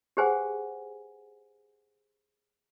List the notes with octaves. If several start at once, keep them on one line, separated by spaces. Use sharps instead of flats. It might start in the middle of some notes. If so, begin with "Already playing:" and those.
G4 G#4 B4 C5 F#5 G#5